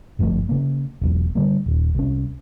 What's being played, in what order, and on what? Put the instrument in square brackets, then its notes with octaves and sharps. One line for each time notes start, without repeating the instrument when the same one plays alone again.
[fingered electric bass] G1 F#2 F3 A3
C#3 A#3
E1 B1
D3 G3 A#3
D#1
C2 C#4